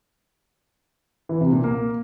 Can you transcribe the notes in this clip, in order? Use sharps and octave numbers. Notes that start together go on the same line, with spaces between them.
E3
C3
A#2
A#3